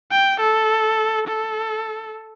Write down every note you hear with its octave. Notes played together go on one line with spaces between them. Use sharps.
G5
A4
A4